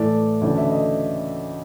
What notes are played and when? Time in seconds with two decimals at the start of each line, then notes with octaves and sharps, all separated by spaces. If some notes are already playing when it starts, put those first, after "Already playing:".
Already playing: A2 E3 A3 D5
0.41 D2 C#3 E3 A3 D5
0.57 E5
0.70 D#5